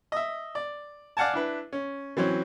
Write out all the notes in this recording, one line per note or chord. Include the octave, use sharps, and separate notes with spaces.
D#5 E5
D5
D5 F5 F#5 G#5 A5
D4 E4 B4
C#4
E3 F#3 C4 C#4